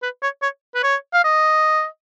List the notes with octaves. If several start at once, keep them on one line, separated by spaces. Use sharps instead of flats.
B4
C#5
C#5
B4
C#5
F5
D#5